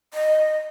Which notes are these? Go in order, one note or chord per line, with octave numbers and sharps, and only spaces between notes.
D#5